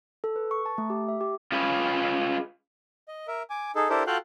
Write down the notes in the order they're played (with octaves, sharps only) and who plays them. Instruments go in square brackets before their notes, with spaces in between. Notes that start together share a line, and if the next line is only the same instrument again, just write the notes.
[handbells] A4
B4
C#6
A5
A3
G4
E5
G4
[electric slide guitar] C#4 F4 G#4 B4
[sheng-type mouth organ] D#5
A#4 E5
G#5 D6
D#4 G#4 A4
D4 E4 G4 A4 A#4 C5
F4 F#4 A4 F5 G5 F#6